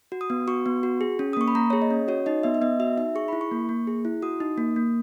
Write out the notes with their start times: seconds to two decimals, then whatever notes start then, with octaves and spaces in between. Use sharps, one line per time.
0.12 F#4
0.21 D#6
0.30 B3
0.47 F#4 C#6
0.66 B3
0.83 F#4
1.01 G#4
1.19 C#4
1.33 D#6
1.37 A#3 C#6
1.48 B5
1.55 A#3 A#5
1.70 G#4 C#5
1.82 D#5
1.91 C#4
2.08 F#4 C#5
2.26 D#4 D#5
2.43 B3 E5
2.54 E5
2.62 B3 D#5
2.79 F#4 E5
2.97 D#4 E5
3.15 G#4 C#6
3.28 E4 B5
3.41 C#6
3.51 A#3
3.69 A#3
3.87 G#4
4.05 E4
4.22 F#4 D#6
4.40 D#4
4.58 A#3
4.76 A#3